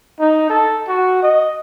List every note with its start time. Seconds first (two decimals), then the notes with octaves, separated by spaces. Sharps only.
0.20 D#4
0.49 A4
0.88 F#4
1.23 D#5